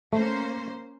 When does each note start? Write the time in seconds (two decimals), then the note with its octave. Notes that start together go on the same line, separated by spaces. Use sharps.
0.13 A3 A#3 C#4 C5